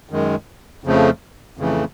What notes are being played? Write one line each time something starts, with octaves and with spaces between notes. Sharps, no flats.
F#2 D#3 G#3
F2 C#3 F3 A3
F2 C#3 E3 A3